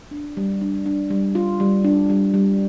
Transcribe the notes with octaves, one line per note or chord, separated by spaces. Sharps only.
D4
G3
D4
D4
G3
F4
G3
D4
G3
G3